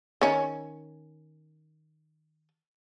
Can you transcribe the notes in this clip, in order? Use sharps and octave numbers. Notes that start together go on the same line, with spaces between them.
D#3 C#4